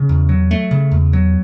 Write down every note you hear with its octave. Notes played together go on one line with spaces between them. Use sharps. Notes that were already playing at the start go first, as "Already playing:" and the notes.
Already playing: C#3
E2
F#3
A3
C#3
E2
F#3